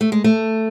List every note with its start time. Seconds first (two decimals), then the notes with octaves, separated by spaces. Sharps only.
0.01 A3
0.12 G#3
0.24 A3